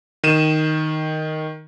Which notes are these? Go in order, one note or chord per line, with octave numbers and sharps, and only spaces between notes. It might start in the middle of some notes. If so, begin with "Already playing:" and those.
D#3 D#7 E7